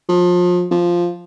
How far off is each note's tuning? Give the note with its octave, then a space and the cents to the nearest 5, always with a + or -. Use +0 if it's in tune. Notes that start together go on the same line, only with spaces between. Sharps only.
F3 +30
F3 +0